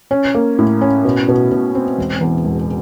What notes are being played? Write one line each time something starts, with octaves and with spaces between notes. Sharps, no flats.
C#4
A#3
A2
C#4
B2
B2
B2
C4
E1
E2
E1